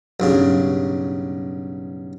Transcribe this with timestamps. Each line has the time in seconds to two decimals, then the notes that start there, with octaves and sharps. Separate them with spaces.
0.20 B1 G2 C#3